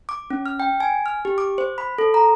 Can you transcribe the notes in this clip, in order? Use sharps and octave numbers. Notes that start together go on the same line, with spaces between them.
D6
C#4
F6
G5
G#5
F6
G4
D6
C5
B5
A4
A#5